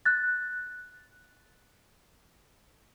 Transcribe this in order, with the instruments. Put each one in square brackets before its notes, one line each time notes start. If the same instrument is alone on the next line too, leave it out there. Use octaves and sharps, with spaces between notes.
[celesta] F#6 A6